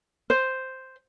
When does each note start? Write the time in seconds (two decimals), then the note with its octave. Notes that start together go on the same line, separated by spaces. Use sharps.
0.30 C5